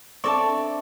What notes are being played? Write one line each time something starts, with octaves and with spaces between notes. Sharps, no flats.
C4 D4 A4 D5 E5 A5 C#6